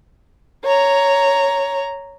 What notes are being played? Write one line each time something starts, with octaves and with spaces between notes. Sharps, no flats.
C#5 A#5